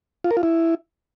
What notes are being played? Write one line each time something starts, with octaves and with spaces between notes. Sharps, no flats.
F4
A#4
F4
E4